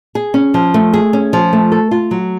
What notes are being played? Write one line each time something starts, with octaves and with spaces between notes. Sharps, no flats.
G#4
C#4
F3
A3
G#4
C#4
F3
A3
A4
F4
F#3